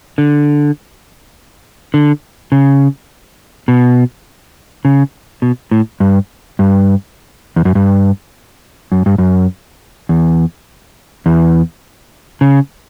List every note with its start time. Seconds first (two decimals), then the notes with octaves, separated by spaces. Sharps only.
0.18 D3
1.94 D3
2.52 C#3
3.68 B2
4.85 C#3
5.42 B2
5.71 A2
6.00 G2
6.59 G2
7.56 E2
7.65 F#2
7.75 G2
8.92 F#2
9.06 G2
9.18 F#2
10.09 E2
11.26 E2
12.41 C#3